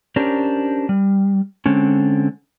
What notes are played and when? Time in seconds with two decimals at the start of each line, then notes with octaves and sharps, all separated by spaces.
0.16 C#4 D4 G4 A#4 C5
0.89 G3
1.66 D3 G#3 C4 C#4